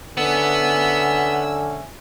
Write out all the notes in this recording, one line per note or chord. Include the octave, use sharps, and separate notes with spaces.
D3 C#4 B4 E5 F#5 G#5 E6